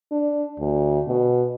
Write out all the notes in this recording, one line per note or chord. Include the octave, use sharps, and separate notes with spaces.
D4
D2
B2